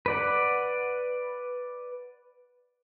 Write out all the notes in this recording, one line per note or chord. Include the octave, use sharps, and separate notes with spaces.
B4 D5 F#5